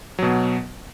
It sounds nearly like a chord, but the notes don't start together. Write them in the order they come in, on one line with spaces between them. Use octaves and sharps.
F#3 B2 B3